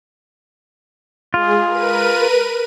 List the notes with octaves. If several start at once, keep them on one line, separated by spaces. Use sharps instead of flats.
G#3 F4 G#4
A#4 B4 D#7